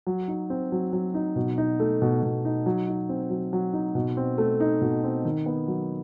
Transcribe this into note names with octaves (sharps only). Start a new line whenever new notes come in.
F#3
D#4
C4
F#3
F#3
D#4
B2
D#4
A3
B2
B2
D#4
F#3
D#4
C4
F#3
F#3
D#4
B2
C4
A3
D#4
B2
C4
D#3
B3
F#3